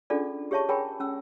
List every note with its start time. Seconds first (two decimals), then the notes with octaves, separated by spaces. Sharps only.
0.10 C#4 D4 F4 G#4 A4 D5
0.51 G4 G#4 C#5 E5 A5 C#6
0.69 G#4 A#4 C#5 G5 G#5 B5
1.00 C#4 E6